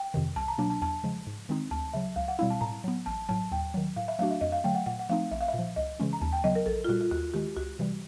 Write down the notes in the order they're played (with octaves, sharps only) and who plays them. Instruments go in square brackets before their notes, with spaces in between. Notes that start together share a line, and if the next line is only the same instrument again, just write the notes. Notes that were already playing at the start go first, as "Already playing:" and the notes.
Already playing: [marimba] G5
[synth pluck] F2 C3 D#3
[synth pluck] C2 [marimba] A5
[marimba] A#5
[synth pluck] B2 F#3 A#3 D4 [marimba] A5
[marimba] A5
[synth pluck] E2 [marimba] A5
[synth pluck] C#3 F3 G#3
G#2
D#3 G#3 C4 D#4
[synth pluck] D2 [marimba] A5
[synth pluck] C#3 F#3 [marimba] E5
[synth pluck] C#2 [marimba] F5
[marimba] F#5
[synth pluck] B2 G3 C4 E4 [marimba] F5
[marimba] A5
[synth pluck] A2 [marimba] A#5
[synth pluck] F#3 B3
[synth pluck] A1 [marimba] A5
[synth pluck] A2 F#3 [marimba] A5
[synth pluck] D#2 [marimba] G5
[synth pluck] D#3 F#3
[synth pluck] A2 [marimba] F5
[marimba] E5
[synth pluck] F#3 A3 D4 F#4 [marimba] F5
[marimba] E5
[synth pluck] F2 [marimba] D#5
[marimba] F5
[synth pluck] D3 F#3 A3 [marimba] G5
[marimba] F#5
[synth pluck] A#2 [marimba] F#5
[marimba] F#5
[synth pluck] F3 A3 C4 D#4 [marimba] F5
[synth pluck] A#1 [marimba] E5
[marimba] F5
E5
[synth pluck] A#2 F3
[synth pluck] C#2 [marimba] D#5
[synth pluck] C#3 E3 G#3 C#4
[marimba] A#5
[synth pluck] D#2 [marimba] A5
[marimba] G5
[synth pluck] C#3 F#3 B3 [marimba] D#5
[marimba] A#4
[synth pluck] A#1 [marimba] A4
[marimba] F4
[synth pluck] A#2 G3 [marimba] F#4
[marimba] F4
[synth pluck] D#2 [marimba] F#4
[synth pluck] D#3 G#3 [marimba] G4
[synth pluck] C#2 [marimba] F#4
[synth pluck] C3 E3 G3